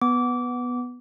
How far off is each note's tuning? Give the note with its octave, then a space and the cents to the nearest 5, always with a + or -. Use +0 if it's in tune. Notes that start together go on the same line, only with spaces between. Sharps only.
B3 +0 D6 -20